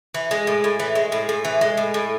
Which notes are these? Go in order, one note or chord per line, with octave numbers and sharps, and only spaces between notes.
E3
G#3
A2
A2
E3
G#3
A2
A2
E3
G#3
A2
A2